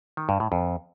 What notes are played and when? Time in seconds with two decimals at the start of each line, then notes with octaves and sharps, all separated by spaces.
0.17 D#3
0.29 G2
0.40 A2
0.52 F2